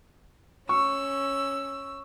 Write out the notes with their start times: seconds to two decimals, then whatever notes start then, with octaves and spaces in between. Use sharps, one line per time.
0.69 C#4 C#6 E6